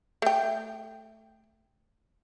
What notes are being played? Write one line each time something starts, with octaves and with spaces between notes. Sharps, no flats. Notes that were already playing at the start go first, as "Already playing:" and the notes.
A3 G5